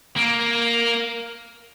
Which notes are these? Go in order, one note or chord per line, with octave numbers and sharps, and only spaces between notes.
A#3